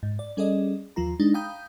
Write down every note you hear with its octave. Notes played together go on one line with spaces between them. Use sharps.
G#2
D5
G3 C#4 G#4 A4 D5 D#5
D#2 F3 F4 A#5
G#3 D4 D#4
F5 G5 A#5 B5 D#6 G6